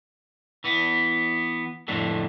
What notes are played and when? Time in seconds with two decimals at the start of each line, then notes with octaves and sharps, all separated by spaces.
0.64 E3 B3
1.88 F2 A2 D3